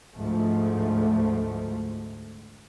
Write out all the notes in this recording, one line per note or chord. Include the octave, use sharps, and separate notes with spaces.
D2 G#2 F3 A3